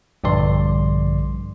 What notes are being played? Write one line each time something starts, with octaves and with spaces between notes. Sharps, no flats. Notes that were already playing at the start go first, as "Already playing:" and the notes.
A#1 G2 D3 D5 C6